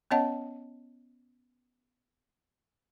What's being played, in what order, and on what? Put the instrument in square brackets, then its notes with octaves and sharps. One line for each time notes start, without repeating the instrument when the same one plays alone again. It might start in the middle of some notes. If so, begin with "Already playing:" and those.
[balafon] B3 C#4 C#5 D#5 F#5 A5